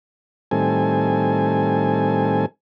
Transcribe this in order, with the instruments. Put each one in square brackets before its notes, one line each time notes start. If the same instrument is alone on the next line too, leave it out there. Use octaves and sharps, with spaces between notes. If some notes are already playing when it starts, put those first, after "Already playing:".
[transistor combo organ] A2 D#3 G3 C4 A4 G#5